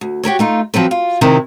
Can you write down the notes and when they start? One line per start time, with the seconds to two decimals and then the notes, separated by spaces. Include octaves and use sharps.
0.01 D2
0.23 F#4 G4 A#4 C#5
0.39 A3 D#4 F4
0.74 F3 F#3 C4 B4
0.91 F4
1.21 C3 D#3 C4 E4 G4